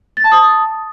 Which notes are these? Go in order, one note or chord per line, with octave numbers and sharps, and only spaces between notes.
A6
A5
D#6